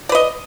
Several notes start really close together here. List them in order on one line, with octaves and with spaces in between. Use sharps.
D5 B4 D#5